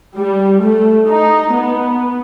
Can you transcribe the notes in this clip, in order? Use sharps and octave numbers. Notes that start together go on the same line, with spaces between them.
G3
A3
D#4
B3